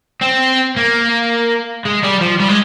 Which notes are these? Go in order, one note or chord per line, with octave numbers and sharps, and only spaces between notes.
C4
A#3
G#3
G3
F3
G3
G#3